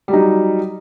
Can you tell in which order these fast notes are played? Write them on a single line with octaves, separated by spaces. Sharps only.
G3 F#3 D#4